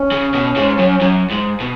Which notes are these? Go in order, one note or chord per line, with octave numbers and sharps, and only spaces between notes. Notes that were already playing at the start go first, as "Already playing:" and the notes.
Already playing: C#4
C#3
B2
G#2
F#2
F#2
G#2
B2